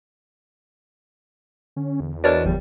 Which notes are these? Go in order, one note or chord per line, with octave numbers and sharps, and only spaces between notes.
D3 C#4
E2
D4 F#4 A#4 B4 C#5 D#5 A6
G1 F2 F3 G3